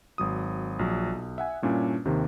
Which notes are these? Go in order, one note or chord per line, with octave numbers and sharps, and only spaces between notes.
G#1 F#3 D#6
A#1 F#3
B1
E5 F#5 G#5
G2 A#2 C#4 D4 E4
D#2 C3 D#3